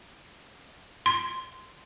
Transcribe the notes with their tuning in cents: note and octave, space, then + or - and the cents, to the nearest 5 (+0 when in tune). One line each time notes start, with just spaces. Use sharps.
C6 -15